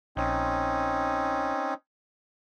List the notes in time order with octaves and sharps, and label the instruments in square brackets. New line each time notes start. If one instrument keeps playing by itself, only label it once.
[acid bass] A#1 [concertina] C4 C#4 D#4